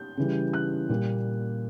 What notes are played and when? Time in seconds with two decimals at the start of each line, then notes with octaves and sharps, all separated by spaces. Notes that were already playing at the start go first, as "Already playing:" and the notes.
Already playing: G6
0.17 C#3 E3 G3
0.53 F#6
0.89 A#2 G3 A#3